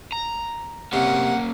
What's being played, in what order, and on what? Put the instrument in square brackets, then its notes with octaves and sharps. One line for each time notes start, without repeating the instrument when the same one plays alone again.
[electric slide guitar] A#5
[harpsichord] C3 [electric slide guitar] A#3 C#4 [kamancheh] F#5